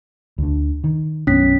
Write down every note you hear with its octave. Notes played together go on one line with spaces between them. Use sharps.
D2 D3
D#3
B1 F#2 B3 C#4 B6